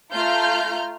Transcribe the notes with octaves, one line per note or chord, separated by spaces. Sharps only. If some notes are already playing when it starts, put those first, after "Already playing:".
A3 F4 A#5 F6 G6